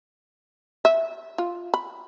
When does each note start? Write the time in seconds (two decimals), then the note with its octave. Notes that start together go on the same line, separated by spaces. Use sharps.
0.85 E5
1.38 F4
1.74 B5